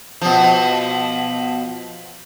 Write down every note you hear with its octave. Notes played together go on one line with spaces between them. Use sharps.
B2 F3